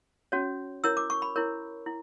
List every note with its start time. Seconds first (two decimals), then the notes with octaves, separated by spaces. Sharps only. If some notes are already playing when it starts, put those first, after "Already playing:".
0.32 C#4 F#4 C#5
0.84 E4 A#4 C#5 E6
0.97 D6
1.10 C#6
1.22 B5
1.36 E4 A#4 C#5
1.86 E4